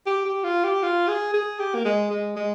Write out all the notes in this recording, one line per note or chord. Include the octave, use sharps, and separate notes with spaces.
G4
G4
F4
G4
F4
G#4
G#4
G4
A#3
G#3
G#3
G#3